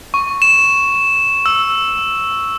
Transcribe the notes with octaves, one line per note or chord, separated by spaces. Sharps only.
C#6
E7
E6